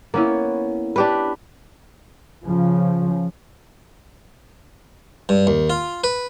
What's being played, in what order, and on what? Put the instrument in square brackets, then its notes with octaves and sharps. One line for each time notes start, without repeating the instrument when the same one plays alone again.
[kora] A#3 [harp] B3 C#4 E4
[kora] D4 G4 B4
[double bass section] C#3 F3
[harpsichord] G2
D#2
F4
B4